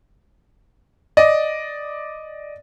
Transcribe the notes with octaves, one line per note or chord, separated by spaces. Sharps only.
D5 D#5